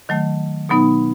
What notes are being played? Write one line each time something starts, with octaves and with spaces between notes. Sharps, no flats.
D#3 F#3 A3
B2 F#3 B3 D#4